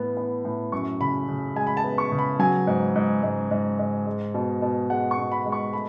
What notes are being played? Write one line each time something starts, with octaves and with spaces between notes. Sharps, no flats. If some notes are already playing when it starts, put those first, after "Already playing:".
Already playing: A2 E3 B3
B3
A2
F#2 C#6
C#3 B5
C#3
G#3 G#5
B5
A5
B3
C#6
C#3
B5
F#3 G#5
G#2
G#2
G#2
G#2
G#2
G#3
B2
B2
G#3 F#5
C#6
B2
B5
G#3
C#6
A3 B5